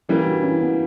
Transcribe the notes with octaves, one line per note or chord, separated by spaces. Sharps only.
E3 G3 A#3 C#4 E4
D4 F#4
C#4 E4
B3 D4